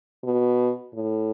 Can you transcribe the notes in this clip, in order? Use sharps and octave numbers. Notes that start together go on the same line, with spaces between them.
B2
A2